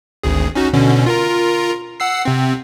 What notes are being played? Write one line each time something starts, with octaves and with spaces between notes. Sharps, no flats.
G#1 D2 G#4
C#4 D#4 F#4
B2 D3 C#4
F4 A#4 A#5
F#5 E6 C7
C3 C4